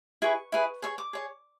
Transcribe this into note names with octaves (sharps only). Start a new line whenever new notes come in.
E4 G#4 B4 C#6
E4 G#4 B4
G#4 C#5 C#6
D6
G#4 C#5